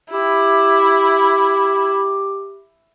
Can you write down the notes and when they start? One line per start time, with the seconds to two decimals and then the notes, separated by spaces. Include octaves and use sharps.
0.11 E4 G4